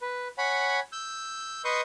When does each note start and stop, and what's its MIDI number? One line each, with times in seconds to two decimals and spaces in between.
0.01 0.28 71
0.38 0.80 73
0.38 0.80 78
0.38 0.80 80
0.38 0.80 83
0.92 1.62 88
0.92 1.62 91
1.65 1.81 71
1.65 1.81 75
1.65 1.81 84
1.65 1.81 85
1.65 1.81 87
1.65 1.81 91